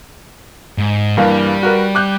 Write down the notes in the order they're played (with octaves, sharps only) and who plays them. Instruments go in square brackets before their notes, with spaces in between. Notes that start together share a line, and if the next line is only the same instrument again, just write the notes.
[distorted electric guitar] G#2
[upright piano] G2 E3 A#3 [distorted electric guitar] G3
[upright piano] F#4 A#4 B4
D6 F#6 G6